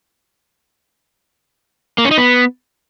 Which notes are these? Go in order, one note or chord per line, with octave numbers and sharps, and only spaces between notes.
A#3
C#4
D#4
B3